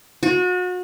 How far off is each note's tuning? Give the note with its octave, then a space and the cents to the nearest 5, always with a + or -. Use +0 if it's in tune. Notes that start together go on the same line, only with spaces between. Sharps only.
F#4 -35